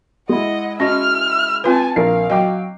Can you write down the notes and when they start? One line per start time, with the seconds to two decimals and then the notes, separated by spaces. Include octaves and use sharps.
0.29 G#3 E4 D#5 F#5
0.80 C#4 F#4 D#5 E5 F6
1.64 C4 F4 B4 G#5 A5
1.96 A#1 A#4 F5 C7
2.30 F#3 D#5 G5 D6